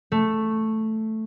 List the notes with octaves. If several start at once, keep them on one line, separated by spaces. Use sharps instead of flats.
A3